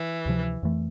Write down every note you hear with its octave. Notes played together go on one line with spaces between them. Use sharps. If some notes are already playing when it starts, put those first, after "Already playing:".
Already playing: E3
D2 C3 F3
F2 E3 A3